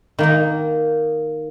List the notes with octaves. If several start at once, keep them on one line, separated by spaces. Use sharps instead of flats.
D#3 A#3 D#4